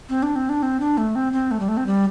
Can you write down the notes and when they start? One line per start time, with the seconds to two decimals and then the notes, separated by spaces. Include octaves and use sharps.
0.09 C4
0.23 D4
0.36 C4
0.49 D4
0.63 C4
0.80 D4
0.98 A3
1.15 C4
1.33 C4
1.51 A3
1.60 G3
1.69 A3
1.77 C4
1.87 G3